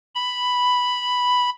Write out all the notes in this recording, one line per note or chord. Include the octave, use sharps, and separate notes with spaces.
B5